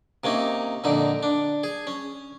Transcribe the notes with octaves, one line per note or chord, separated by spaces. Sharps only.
C3 A#3 C#4 D#4
F2 A#2 D3 D#4
D4
G#4
C#4